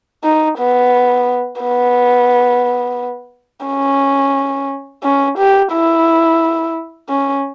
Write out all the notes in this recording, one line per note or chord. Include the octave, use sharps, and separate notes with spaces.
D#4
B3
B3
C#4
C#4
G4
E4
C#4